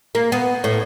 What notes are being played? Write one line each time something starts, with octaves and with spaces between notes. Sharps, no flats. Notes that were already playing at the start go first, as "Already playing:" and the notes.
A#3
B3
A2